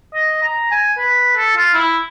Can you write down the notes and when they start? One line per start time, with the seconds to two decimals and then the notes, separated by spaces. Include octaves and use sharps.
0.14 D#5
0.43 A#5
0.72 G#5
0.98 B4
1.36 A4
1.57 F4
1.74 E4